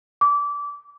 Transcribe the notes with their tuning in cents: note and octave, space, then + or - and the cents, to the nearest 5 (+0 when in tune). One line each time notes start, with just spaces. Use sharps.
D6 -25